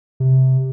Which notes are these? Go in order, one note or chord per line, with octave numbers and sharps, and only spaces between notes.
C3